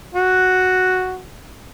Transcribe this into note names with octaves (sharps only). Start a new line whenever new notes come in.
F#4